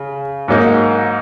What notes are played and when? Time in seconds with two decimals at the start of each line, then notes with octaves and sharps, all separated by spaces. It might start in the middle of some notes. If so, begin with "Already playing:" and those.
Already playing: C#3
0.48 G#2 F#3 A#3 D#4